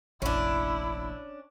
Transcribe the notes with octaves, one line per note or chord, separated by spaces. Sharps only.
F1 A#1 C#4 D4 E4